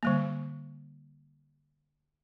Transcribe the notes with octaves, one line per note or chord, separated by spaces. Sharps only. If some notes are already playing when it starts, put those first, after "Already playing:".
D3 G3 A#3